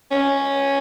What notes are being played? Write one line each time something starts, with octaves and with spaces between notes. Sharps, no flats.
C#4